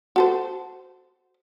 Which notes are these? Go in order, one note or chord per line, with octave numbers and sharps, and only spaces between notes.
F#4 A4 C5